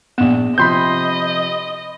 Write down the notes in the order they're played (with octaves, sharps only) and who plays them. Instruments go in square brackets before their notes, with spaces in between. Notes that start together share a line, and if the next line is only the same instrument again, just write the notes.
[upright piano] A#1 E7 [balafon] B3
[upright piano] C3 F3 [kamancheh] D#5 [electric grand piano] B5 C6 G6